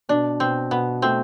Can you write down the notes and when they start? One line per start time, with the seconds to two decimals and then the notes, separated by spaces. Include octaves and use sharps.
0.09 B2 D4
0.40 B2 C4
0.71 B2 B3
1.02 A3 C4